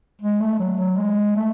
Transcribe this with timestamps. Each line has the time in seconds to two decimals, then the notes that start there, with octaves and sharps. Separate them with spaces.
0.22 G#3
0.41 A3
0.59 F#3
0.78 F#3
0.97 G#3
1.36 A3